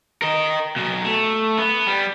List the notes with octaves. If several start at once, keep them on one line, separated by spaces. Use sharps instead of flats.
A#4 D#5
B2 F#3
A3
B3
G3